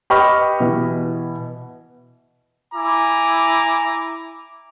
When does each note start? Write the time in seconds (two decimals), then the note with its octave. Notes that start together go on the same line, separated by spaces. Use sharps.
0.10 G4 B4 D#5 B5 C#6 F6
0.60 B2 E3
2.74 E4 G#5 A#5 D6